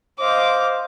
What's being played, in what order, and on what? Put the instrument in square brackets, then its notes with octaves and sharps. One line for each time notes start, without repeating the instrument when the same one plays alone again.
[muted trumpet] C5 [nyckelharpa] D#5 F5 [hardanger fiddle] D6